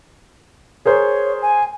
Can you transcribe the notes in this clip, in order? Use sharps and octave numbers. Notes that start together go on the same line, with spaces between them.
G#4 A#4 C5 C#5
G#5